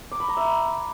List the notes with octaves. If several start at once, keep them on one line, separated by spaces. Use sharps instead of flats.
D6
B5
A#5
E5
B5